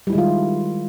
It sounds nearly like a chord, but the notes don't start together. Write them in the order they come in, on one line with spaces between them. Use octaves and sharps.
G3 E4 G#3 D#3 F4